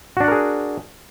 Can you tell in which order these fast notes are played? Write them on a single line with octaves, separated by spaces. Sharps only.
F#4 D4 F#5 A#4 G#4